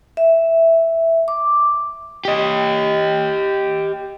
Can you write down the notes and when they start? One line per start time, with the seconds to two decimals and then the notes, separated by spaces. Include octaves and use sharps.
0.17 E5
1.28 D6
2.25 G4 D#5